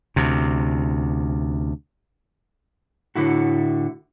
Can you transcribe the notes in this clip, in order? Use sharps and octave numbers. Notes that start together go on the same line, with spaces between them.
D2 C3
A2 D3 E4 F#4